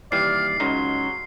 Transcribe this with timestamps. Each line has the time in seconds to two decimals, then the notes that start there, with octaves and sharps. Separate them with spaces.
0.12 D#2 E3 G3 D5 F6 C7
0.60 C#2 C#3 F#3 D#4 C6